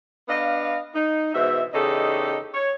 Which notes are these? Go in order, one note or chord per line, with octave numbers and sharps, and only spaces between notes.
B3 D4 D#5 F5
D#4
G#2 B2 E3 C5 E5
E2 C#3 D#4 G4 A4 D#5
C#5